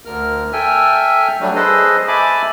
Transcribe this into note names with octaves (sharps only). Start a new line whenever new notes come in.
D2 A#4 F6
A4 E5 G5 G#5 F6
F#3 G3 A3 D4
G#4 A4 B4 C5 D#5
E5 G#5 A5 B5 D6